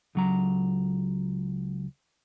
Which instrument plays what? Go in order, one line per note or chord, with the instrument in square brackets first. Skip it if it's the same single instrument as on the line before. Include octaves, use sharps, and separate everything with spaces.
[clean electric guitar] C#2 F#3 A#5